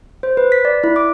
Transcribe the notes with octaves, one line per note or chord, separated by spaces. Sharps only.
C5
B4
B6
D5
E4
D6